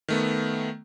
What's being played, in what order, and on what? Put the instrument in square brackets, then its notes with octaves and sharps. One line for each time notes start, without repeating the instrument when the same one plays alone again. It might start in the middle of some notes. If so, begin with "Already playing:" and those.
[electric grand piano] D#3 A3 B3